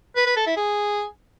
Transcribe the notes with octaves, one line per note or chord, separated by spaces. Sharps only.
B4
B4
A4
E4
G#4